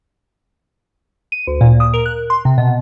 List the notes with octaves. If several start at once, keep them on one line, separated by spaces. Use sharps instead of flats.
D#7
D2
A#2
D#6
A#4
F#6
C6
C3
B2